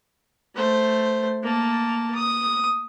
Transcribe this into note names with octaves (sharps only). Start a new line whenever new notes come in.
A3 C5
A#3 A5
D#6